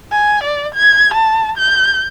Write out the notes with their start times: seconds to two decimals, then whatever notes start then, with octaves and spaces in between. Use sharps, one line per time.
0.12 G#5
0.44 D5
0.75 G#6
1.14 A5
1.58 G6